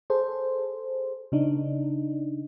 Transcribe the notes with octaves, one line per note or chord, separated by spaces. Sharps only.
G#4 A4 C5
C#3 D4 D#4